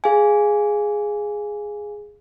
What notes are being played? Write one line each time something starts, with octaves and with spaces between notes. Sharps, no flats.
G#4 F5 G#5